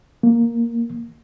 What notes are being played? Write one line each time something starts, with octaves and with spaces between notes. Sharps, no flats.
A#3